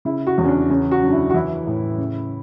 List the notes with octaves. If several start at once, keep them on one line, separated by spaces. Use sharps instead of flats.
C#3 E4
F#4
E2
C#4
D4
C#3 C#4
F#4
F#2
D4
E4
F#4
E3 E4
A2
C#3